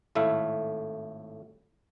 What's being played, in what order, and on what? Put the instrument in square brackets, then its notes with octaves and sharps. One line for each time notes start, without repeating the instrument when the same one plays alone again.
[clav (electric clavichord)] G#1 A2 A3 E4 E5 F5